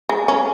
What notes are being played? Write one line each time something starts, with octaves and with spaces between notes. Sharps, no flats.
G#3
C#4